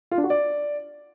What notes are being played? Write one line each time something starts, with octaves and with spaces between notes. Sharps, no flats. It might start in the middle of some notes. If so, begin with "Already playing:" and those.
F4
D4
F#4
D5